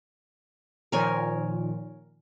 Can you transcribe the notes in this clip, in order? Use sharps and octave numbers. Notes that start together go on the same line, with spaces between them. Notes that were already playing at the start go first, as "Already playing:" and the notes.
A#2 D#3 F3 A#4 C#5 G#5